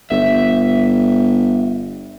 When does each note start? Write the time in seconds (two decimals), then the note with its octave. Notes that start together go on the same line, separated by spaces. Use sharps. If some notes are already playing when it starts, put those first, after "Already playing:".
0.11 G1 E5